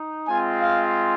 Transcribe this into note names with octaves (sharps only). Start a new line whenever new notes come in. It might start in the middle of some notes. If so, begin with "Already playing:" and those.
Already playing: D#4
G#3 C4 F4 G#5
F5